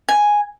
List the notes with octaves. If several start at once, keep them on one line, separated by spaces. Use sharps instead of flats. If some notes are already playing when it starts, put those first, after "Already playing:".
G#5